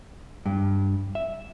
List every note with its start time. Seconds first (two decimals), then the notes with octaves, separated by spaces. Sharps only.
0.46 G2
1.15 E5